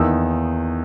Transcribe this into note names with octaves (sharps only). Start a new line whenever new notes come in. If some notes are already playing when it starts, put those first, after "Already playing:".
Already playing: E2 D#3 A#3 D#4 E6